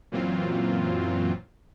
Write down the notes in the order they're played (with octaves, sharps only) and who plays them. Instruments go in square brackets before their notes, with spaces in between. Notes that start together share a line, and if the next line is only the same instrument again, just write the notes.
[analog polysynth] F#2 A#2 E3 F#3 C4 F4